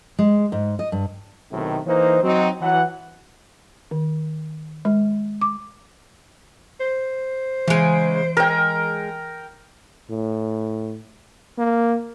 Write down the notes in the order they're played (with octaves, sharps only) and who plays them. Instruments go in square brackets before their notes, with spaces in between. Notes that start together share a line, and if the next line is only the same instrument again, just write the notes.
[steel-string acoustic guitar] G#3
G#2
D#5
G2
[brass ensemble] B1 A2 C3 D#3
E3 A#3 D#4 C5
F#3 C4 D#4
E3 F#3 F#5
[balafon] D#3
G#3
D6
[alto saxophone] C5
[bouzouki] C#3 G#3 [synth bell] E3 D7
[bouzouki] G#3 [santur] A#4 G5
[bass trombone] A2
A#3